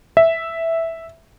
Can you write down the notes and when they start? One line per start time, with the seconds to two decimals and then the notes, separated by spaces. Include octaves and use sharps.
0.17 E5